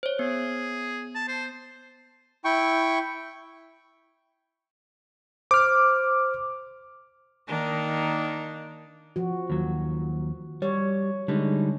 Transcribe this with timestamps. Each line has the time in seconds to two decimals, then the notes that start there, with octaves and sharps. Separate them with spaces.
0.03 C5 C#5
0.19 B3 G#4
1.15 A5
1.28 C5
2.44 E4 G5 C#6
5.51 C5 D6 F6
7.47 D#3 A#3 D4 D#4
9.16 F3 F#4
9.50 D#2 F#3
10.62 G3 C#5
11.28 D3 G3 G#3 D#4